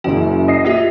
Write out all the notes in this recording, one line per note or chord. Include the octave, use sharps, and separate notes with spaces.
F#1 F#2 F#4
D#5 C7
A#3 F4 G4 D#5 E5